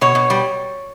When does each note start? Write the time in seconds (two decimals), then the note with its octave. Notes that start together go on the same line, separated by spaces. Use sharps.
0.01 B2 C#5
0.15 B2
0.30 G3